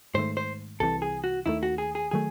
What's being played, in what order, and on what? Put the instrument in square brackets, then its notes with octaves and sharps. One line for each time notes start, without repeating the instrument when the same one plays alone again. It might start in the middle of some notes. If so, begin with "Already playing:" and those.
[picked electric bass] G#2 D#3 A3 [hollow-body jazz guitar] C5
[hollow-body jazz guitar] C5
[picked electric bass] C2 C3 E3 [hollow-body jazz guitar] A4
[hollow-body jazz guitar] G#4
F#4
[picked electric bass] D#2 D#3 A3 [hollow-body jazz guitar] E4
[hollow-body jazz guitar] F#4
G#4
G#4
[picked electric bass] D#3 F#3 A3 [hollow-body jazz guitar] G#4